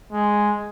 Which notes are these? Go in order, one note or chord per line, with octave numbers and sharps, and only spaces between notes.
G#3